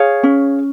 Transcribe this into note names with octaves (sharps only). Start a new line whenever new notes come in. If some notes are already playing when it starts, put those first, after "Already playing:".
Already playing: G#4 C#5 F5
C#4